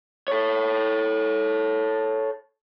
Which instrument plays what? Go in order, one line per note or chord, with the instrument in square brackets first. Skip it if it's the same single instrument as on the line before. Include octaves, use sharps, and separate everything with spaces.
[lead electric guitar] A4 C#5